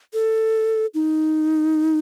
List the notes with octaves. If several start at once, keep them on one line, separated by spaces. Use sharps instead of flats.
A4
D#4